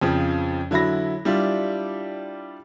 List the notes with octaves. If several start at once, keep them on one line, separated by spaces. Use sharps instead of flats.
F2 C#3 F3
D3 F#3 E4 B5 A#6
G3 D4 E4 F4